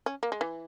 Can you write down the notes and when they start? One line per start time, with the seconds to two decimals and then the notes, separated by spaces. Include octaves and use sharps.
0.06 C#4
0.23 A#3
0.32 G#3
0.41 E3